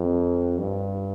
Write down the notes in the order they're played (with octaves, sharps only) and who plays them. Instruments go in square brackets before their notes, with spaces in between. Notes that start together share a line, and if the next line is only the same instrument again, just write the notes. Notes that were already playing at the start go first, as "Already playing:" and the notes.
Already playing: [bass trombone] F2
G2